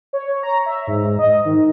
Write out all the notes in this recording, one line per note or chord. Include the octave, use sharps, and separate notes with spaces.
C#5
A#5
E5
G#2
D#5
D#3